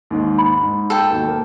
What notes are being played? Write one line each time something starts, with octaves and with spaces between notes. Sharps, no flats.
D#2 G#2
B5
G#2
A4 G5
D#2 B2
A#3